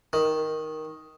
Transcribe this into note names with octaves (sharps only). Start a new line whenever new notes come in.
D#3